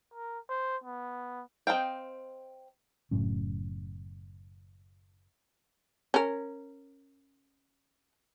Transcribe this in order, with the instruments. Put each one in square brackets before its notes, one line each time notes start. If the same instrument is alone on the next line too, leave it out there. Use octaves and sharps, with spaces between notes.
[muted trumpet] A#4
C5
B3
[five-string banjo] C4 A#4 D#5 F5 G5
[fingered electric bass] F#1 A2 F#3 C#4
[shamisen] C#4 A#4